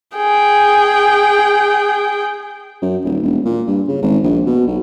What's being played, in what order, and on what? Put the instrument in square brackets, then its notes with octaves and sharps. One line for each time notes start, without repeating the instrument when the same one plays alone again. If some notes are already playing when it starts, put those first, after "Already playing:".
[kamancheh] G#4 G5
[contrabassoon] F#2
D#1
E1
A#2
G2
C#3
G#1
A#1
B2
B1